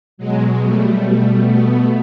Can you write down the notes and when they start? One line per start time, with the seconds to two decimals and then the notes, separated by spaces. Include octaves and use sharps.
0.18 B2 F#3 G#3
0.60 G3 A3
1.03 G3 A3
1.45 A3 B3